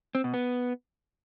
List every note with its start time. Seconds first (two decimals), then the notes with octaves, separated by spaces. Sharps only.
0.15 C4
0.24 B2
0.34 B3